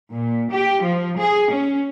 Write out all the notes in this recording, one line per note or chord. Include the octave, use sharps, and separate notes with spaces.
A#2
G4
F3
G#4
C#4